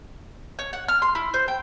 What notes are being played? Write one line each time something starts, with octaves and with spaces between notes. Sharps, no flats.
C#5
F#5
F6
C6
E4
C5
G5